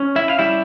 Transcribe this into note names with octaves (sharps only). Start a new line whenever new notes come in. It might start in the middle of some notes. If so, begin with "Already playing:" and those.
Already playing: C#4
E4 E5
F5
G3 E4 E5